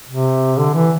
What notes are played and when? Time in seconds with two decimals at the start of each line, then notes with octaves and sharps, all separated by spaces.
0.09 C3
0.58 D3
0.74 E3